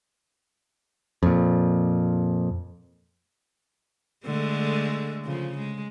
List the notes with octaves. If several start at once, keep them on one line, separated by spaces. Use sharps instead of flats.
F2 A#2
D3 G#3 A3
C#3 F3
G#3